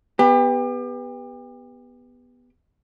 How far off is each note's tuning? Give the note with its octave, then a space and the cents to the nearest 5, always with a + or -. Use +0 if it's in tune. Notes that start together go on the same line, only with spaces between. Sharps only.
B3 +0 G4 +35